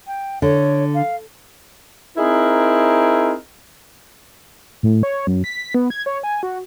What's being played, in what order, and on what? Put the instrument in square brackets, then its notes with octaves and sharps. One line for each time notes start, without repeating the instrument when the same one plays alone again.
[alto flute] G5
[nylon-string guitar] D3 [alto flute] C#5
[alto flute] F5
[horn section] C4 D#4 E4 G#4 A#4
[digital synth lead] A2
C#5
F#2
B6
B3
G#6
C#5
G#5
F#4